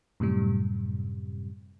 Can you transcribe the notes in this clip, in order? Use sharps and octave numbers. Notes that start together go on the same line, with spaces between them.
F#2 A2 C3 G3